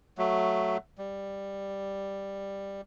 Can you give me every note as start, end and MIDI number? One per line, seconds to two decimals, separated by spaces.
0.18 0.77 54
0.18 0.77 57
0.98 2.81 55